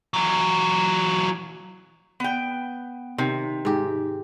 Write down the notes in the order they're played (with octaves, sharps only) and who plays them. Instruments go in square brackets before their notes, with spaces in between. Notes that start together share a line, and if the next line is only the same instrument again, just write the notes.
[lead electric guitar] E3 F#3
[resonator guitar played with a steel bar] B3 G5
[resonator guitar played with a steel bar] C3 [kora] D#3
[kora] G#2 G4